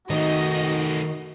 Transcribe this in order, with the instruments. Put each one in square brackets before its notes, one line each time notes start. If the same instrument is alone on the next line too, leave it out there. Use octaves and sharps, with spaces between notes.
[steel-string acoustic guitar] D#3 [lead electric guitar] A3 D#4 [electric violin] F#4 [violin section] D#5